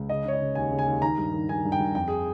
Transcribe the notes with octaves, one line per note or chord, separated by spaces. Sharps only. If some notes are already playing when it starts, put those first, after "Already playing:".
Already playing: C#2
C#3 D#5
C#3 C#5
D#5
C#3
D#2 G#5
C#3
G#5
D#2
D#3 A#5
G2
D#3
D#3 G#5
G2
G5
G2
F2 G5
G#4